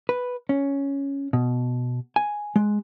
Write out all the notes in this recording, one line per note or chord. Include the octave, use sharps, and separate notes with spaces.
B4
C#4
B2
G#5
G#3